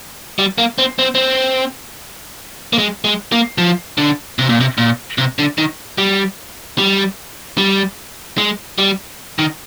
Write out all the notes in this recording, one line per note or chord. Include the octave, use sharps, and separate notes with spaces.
G3
A#3
C4
C4
C4
A#3
G#3
G#3
A#3
F3
D3
C3
A#2
C3
A#2
C3
D3
D#3
G3
G3
G3
G#3
G3
D#3